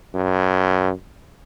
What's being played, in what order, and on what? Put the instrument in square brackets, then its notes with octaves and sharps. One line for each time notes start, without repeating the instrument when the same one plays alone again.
[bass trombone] F#2